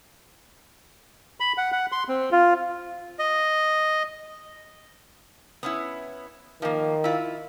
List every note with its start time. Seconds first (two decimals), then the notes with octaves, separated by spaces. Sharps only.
1.40 B5
1.58 F#5
1.72 F#5
1.92 C6
2.09 C4
2.32 F4
3.19 D#5
5.63 B3 C#4 E4
6.62 D#3 F3 A#3
7.04 E4 F4